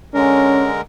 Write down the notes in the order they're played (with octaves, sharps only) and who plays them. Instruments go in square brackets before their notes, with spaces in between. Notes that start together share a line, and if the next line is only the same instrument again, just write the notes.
[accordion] D3 G#3 A#4 [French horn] C#4